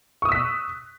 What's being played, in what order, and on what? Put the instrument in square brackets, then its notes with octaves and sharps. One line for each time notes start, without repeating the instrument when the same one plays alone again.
[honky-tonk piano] C#6
D#6
E6
B6
F#6